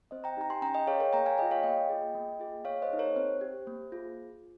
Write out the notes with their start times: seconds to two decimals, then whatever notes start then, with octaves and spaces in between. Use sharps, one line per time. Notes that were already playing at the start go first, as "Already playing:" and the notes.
0.11 C4 C5 D#5
0.24 G5 A#5
0.37 D#4 G4 A#5
0.50 G#5 C6
0.62 C#4 G5 A#5
0.74 D#5 G5
0.87 G#4 C#5 F5
1.00 A#4 C#5
1.13 A#3 G5 A#5
1.26 F5 G#5
1.38 F4 G#4 D#5 G5
1.51 C#5 F5
1.63 A#3 D#5 G5
1.89 F4 G#4
2.15 A#3
2.40 F4 G#4
2.65 A#3 C#5 F5
2.82 C5 D#5
2.91 D#4 G#4
2.99 A#4 C#5
3.16 C4 C5
3.41 G4
3.67 A#3
3.92 F4 G#4